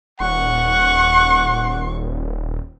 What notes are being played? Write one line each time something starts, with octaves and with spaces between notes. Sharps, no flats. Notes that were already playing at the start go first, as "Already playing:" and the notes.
D#1 F#5 C#6